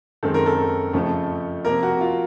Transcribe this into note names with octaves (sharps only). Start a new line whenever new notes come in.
F#2 D#3 G#3 C4 A4
A#4
A4
F2 C#3 F3 A3
C3 F3 A#3 A#4
F#4
F4